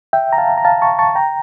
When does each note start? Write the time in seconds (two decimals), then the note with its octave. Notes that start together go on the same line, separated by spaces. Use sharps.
0.13 E5 G5
0.33 A#5
0.38 F5 A5
0.58 A#5
0.65 F5 A5
0.82 A5 C#6
0.99 A5 C#6
1.15 G5 A#5